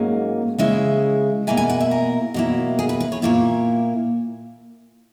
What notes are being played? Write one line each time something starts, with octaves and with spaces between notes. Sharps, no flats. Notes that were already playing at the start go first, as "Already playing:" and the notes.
Already playing: G#2 F#3 A#3 C#4
C#3 G#3 C#4 E4 E5
B2 A#3 E4 G#5
G#5
F#5
E5
A#4
B2 F#3 A#3 E4
G#4
B4
B4
C#5
A#2 A#3 E4 C#5